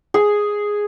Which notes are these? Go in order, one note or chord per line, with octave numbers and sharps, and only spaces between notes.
G#4